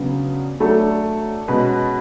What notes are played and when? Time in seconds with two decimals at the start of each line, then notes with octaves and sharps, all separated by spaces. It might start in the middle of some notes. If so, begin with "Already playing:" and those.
Already playing: C#3 F#3 B3 D4
0.60 F#3 A3 D4 A4
1.48 B2 G#3 C#4 F#4 B4